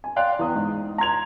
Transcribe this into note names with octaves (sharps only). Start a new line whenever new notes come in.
G#5
D5 F5 G5 C6 F#6
E2 D#6
G#2
A#5 C6 G#6 F7